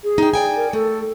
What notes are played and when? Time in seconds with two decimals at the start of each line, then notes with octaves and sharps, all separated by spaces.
0.04 G#4
0.18 D#4 G5
0.34 D5 G5 G#5
0.56 A#4
0.73 A3 A4